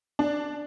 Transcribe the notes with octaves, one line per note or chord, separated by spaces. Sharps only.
D4